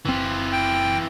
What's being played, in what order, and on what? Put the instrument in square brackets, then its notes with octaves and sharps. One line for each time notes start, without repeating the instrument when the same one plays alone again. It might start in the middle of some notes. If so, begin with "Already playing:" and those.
[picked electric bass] F#1 A2 C4 [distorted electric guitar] E3 F4
[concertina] G5